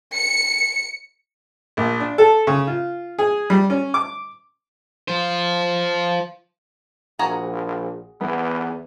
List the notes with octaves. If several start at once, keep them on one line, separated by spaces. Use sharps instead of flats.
C#7
A#1
D4
A4
C#3
F4
G#4
G3
C#4
D6
F4 C5
A#1 F#4 G#4 A#5
E2 B3